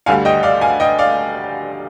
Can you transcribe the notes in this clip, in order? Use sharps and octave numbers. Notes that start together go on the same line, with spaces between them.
D2 D3 G3 F5 G#5
D#5 G5
D5 F5
F5 G#5
D#5 G5
D5 F5